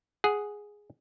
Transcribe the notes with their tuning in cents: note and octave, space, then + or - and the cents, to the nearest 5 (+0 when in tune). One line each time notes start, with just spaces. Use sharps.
G#4 +0 F#5 +0